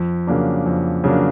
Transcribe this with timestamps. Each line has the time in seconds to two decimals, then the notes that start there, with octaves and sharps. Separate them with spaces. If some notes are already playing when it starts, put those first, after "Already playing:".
Already playing: F2
0.27 C#3 F#3 A#3 D4
0.66 F2
1.04 C#3 F#3 A#3 D4